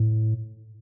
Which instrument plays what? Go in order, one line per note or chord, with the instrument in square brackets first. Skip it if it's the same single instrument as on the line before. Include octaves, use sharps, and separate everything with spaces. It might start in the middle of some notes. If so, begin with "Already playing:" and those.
Already playing: [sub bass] A2